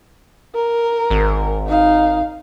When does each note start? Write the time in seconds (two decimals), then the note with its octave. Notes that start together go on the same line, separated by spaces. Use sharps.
0.55 A#4
1.10 G#1
1.67 D#4 F5